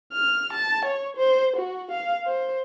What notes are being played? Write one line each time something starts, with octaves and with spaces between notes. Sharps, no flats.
F6
A5
C#5
C5
F#4
F5
C5